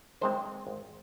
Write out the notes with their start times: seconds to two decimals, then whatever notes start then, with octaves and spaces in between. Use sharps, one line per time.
0.21 D#3 G#3 C4 C5
0.67 G#1